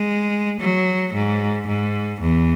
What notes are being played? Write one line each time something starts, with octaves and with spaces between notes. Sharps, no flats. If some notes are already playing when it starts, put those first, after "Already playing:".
Already playing: G#3
F#3
G#2
G#2
E2